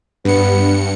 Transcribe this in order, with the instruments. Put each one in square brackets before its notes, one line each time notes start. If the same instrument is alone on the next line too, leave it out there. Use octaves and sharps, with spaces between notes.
[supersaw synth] G2 C#7 [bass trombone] B3